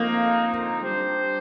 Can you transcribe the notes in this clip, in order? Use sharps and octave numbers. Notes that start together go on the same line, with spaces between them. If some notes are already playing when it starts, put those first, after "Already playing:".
Already playing: F2 D3 F3 A#3 C4 D#4
G3 D4 G4 C5